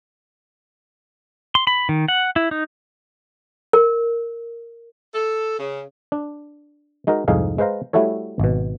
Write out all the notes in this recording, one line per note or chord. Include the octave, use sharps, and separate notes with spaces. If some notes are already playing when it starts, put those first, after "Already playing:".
C6
B5
D#3
F#5
E4
D#4
A#4
A4
C#3
D4
G#3 D#4 F#4 A#4
C2 F2 G#2 D#4 G#4 F5
G#3 B4 C5 F5 A#5
G3 A3 E4 F#4 A4 C#5
G#1 B2